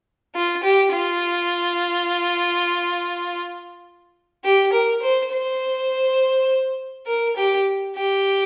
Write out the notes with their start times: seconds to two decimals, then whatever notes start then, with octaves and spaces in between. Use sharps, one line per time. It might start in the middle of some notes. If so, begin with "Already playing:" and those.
0.35 F4
0.63 G4
0.92 F4
4.44 G4
4.72 A#4
5.02 C5
5.31 C5
7.07 A#4
7.36 G4
7.95 G4